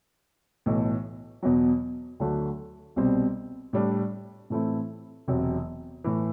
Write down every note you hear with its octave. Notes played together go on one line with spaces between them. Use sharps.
B1 A2 E3
E2 B2 F#3
D2 D3 F#3 A3 D4
C2 B2 G3 C4
A2 G3 D4
A2 E3 A3 C4 E4
E1 E2 C3 F#3
A2 E3